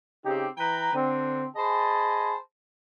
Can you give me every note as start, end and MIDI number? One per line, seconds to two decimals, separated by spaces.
0.25 0.47 49
0.25 0.47 60
0.25 0.47 63
0.25 0.47 67
0.58 0.92 52
0.58 0.92 71
0.58 0.92 79
0.58 0.92 82
0.93 1.45 50
0.93 1.45 60
1.56 2.36 68
1.56 2.36 72
1.56 2.36 75
1.56 2.36 80
1.56 2.36 81
1.56 2.36 83